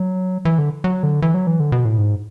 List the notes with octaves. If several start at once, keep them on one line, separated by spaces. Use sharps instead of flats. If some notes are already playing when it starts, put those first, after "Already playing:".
Already playing: F#3
E3
D3
F#3
D3
E3
F#3
E3
D3
B2
A2
G#2